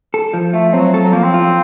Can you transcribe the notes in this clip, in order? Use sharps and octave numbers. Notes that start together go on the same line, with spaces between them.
A4
F3
A3 F4
F#3 C4
A4
F#3
F3 A#3
C4
F4